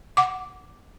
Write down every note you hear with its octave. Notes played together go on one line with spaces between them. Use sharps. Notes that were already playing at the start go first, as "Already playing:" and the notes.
F#5 D6